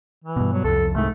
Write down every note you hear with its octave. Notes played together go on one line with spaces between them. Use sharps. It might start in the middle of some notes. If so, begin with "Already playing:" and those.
E3
G2 B2
F#3
C2 F2 A4
C2 G#2 A3